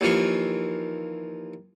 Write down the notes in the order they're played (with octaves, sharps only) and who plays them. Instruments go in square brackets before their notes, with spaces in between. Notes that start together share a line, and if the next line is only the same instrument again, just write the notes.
[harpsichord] D#2 E3 F3 F4 C#6